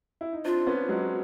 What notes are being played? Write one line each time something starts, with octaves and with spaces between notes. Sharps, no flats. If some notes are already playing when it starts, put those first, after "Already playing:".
E4
D#4
C4 D4 F4
B3 C#4
F#3 G#3